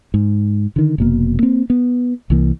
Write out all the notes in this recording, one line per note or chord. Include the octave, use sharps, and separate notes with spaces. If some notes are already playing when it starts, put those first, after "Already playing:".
G#2
D3 D#3
F1 B2 A#3
A#3 C4
B3
C2 E3 A#3